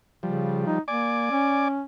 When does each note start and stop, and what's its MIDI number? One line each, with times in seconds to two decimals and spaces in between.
0.23 0.66 49
0.23 0.79 53
0.23 0.79 55
0.66 0.80 63
0.88 1.29 58
0.88 1.68 74
0.88 1.68 80
0.88 1.68 86
1.31 1.83 61